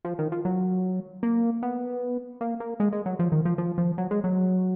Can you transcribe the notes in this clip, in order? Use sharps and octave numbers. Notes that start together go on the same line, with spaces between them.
F3
D#3
F3
F#3
A#3
B3
A#3
A#3
G#3
G#3
F#3
F3
D#3
F3
F3
F3
F#3
G#3
F#3